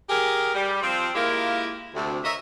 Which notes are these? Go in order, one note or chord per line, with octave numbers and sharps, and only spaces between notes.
G4 G#4 A#4
G3
F3 C4
G#3 A#3 E4 F4 G4 A#4
D2 C3
A#4 C#5 D#5 E5